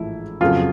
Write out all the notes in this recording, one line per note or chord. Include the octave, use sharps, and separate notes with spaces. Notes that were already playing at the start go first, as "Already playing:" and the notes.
Already playing: A1 G#2 F3 A3 E4
F#1 F2 C#3 F#3 F4